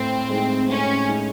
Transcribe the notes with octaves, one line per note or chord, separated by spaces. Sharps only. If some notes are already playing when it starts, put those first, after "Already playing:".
Already playing: A2 C4
G#3 D#4
A2 C#4
G#3 D#4